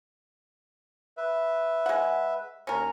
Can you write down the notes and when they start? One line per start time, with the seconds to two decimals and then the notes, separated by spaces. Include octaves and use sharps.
1.17 B4 E5
1.86 G#3 F#5
2.67 D#2 C#4 A#4